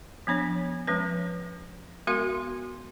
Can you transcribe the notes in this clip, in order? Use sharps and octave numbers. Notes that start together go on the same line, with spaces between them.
F3 B3 D4 C#5
F3 G#3 C#4 B4
G#3 B3 F#4 A#4 F5 C6